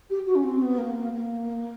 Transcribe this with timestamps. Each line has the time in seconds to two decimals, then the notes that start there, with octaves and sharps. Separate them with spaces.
0.10 G4
0.26 F#4
0.35 C#4
0.44 C4
0.62 B3
0.78 A#3
1.12 A#3